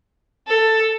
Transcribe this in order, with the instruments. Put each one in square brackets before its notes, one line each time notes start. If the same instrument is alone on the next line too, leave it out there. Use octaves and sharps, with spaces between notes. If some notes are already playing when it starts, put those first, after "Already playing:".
[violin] A4